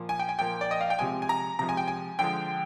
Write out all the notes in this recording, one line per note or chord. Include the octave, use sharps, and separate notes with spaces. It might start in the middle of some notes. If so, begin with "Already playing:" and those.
Already playing: A#2 F3 A#3
G#5
G5
G#5
A#2 F3 A#3 G5
D5
D#5
F5
G5
C3 F3 G#3 G#5
G#5
A#5
C3 F3 G#3 A#5
G#5
G5
G#5
D3 F3 G#3 G5